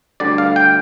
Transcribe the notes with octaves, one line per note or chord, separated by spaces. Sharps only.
D2 D3 G3 D5
F5
G5